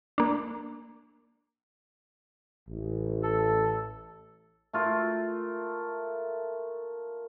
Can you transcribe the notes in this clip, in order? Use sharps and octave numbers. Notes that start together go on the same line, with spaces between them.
A#3 D4
A1
A4
A3 F4 A#4